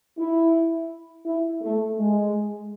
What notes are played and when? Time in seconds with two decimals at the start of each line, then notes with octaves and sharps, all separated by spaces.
0.18 E4
1.25 E4
1.62 A3
1.98 G#3